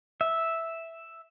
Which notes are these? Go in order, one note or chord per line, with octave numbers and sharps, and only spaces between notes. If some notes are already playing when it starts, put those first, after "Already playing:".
E5